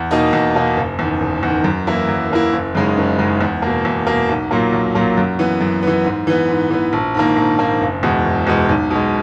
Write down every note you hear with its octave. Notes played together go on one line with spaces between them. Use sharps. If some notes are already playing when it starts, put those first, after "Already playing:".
Already playing: E2
B2 A#3 D#4
E2
B2 A#3 D#4
F#1
E2 D#3
F#1
E2 D#3
F#2
E3 A#3 E4
F#2
E3 A#3 E4
F#1
F#2 C#3 G#3 D#4
F#1
F#2 C#3 G#3 D#4
E2
B2 A#3
E2
B2 A#3
B1
A#2 F#3 A#3
B1
A#2 F#3 A#3
F#2
E3 B3
F#2
E3 B3
G#2
E3 B3
G#2
E3 B3
A#1
G#2 D#3 A#3
A#1
G#2 D#3 A#3
F#1
E2 B2 G#3
F#1
E2 B2 G#3
B1
B2 G#3